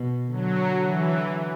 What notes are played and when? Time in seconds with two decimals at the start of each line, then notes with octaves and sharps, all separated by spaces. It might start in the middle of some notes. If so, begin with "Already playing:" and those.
Already playing: B2
0.31 D3 F#3
0.83 E3